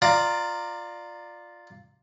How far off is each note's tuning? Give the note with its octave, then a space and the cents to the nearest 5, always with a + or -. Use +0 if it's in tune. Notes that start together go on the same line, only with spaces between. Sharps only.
F4 +0 D5 +15 A#5 -10